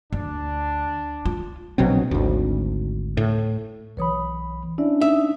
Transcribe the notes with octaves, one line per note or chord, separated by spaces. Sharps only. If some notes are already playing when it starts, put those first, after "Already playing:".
D2 D4
F4
A#1 B2 F#3 C4
G#1 D2
A2
B1 E3 B4 C#5 B5 D#6
C#4 D4 E4 D5 E5
D#4 E5